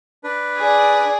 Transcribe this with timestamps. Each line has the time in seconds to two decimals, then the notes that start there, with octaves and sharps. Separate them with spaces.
0.24 D4 B4
0.57 G#4 D5